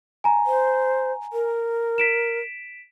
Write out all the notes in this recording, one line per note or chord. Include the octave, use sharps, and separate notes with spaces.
G#5 A#5
C5
A#4
B6 D7 E7